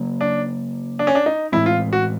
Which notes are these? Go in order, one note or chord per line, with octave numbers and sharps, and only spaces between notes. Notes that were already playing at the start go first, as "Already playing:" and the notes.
Already playing: C#3 F#3 A#3
D4
D4
C#4
D4
D#4
A2 E3 G#3 C4 E4
F4
F#4